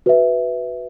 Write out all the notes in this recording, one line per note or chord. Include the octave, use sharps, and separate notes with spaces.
F#4 B4 E5